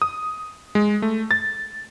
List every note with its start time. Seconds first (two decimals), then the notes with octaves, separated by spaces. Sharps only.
0.02 D#6
0.75 G#3
1.02 A3
1.31 A6